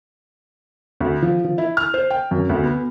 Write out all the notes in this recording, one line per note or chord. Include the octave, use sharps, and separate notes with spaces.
D2
F3
F3
E4
F6
C5
G5
F#2
D2
B3